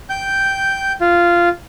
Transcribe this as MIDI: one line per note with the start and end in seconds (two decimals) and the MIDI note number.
0.10 0.93 79
0.10 0.93 91
1.01 1.49 65